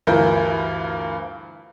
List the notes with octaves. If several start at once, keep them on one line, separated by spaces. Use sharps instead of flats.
D2 G2 E3 F4 A#4 G6